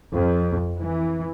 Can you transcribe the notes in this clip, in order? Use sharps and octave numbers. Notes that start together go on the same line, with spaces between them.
F2
E3